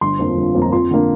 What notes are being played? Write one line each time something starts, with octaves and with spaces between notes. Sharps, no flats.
G1 C6
F2 F3 A#3
G1
F2 F3 A#3
A#5
F2 C6
D3 A#3